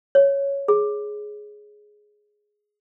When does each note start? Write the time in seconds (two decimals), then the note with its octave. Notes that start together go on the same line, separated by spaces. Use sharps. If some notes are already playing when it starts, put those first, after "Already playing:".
0.15 C#5
0.68 G#4